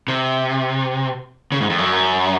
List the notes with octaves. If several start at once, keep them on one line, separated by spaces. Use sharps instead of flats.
C3
C#3
G#2
F2
F#2